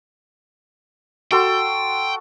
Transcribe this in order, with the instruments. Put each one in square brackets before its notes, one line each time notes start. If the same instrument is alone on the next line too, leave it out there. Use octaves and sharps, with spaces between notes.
[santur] F#4 A4 C6 [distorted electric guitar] G5